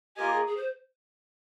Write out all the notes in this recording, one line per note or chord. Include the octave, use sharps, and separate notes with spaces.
A#3 F4 G4 A#4 D#5 G#5
G#4
G#4
C5